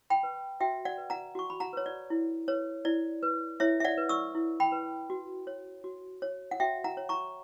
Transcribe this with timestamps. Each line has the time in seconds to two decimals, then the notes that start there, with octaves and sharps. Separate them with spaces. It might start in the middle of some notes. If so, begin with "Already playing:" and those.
0.10 G5 B5
0.23 B4
0.60 F#4 E5 G5
0.85 D5 F#5
0.98 B4
1.10 F#5 A#5
1.35 F#4 C#6
1.50 B5
1.60 F#5 A#5
1.73 B4 C#5
1.86 D5
2.10 E4
2.48 B4 C#5
2.85 E4 D5
3.23 B4
3.60 E4 C#5 E5
3.80 E5
3.85 D5 F#5
3.98 B4
4.09 C#6 E6
4.35 E4
4.60 G5 B5
4.72 B4
5.10 F#4
5.47 C#5
5.84 F#4
6.22 C#5
6.51 F#5
6.60 F#4 E5 G5
6.84 F#5 A#5
6.97 C#5
7.09 A#5 C#6